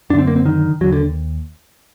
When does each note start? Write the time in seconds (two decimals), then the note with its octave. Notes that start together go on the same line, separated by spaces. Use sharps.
0.10 F#2 D4
0.15 D3 C4
0.27 A#3
0.36 C4
0.46 D#3
0.81 D#2 D3 F#3
0.93 D3